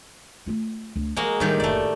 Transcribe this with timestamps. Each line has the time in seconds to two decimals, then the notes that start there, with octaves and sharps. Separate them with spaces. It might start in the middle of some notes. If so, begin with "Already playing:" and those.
0.46 A3 F4
0.96 D2
1.16 F3 G#3 A#3 F#4
1.40 A2 D#3 G3 G4
1.60 F#1 A#2 A3 D5